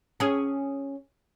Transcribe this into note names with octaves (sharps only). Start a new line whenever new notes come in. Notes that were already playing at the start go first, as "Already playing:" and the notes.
C#4 G#4